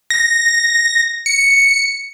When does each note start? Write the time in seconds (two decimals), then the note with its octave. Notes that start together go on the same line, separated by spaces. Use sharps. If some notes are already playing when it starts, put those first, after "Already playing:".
0.10 A#6
1.26 C#7